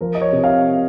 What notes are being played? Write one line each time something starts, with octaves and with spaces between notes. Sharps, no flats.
F3 A#4
D#5
C#5
C3
F5